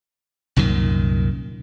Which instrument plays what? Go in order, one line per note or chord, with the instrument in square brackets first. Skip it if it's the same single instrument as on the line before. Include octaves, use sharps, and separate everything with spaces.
[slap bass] C2 F#2 A#2 D#3